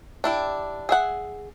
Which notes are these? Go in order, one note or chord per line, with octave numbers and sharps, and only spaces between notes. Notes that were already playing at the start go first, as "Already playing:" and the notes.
D4 E4 G4
G#4 E5 F#5